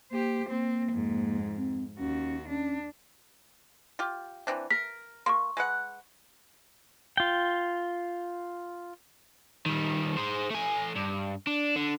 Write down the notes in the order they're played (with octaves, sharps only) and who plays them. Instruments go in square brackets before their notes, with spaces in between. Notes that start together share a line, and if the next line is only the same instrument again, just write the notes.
[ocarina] A#3 [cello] G4 C5
[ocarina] A#3 [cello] C4
[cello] F2 G#2
[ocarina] C4
[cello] D#2 F#4 [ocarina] C#4
[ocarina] C#4 [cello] D4
[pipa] F4 G4
E3 C4 D4
[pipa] A#4 [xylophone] B6
[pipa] A#3 [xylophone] C6 C#6
[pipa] G#3 B4 F#5
[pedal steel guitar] F4 G5
[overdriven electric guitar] D#3 G3
G#4 C5
A3 G#5
G2
D4
D3